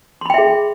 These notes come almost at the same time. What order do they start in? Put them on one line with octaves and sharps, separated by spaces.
C6 B5 G5 E5 G#4